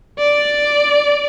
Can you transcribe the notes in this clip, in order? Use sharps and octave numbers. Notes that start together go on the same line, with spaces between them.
D5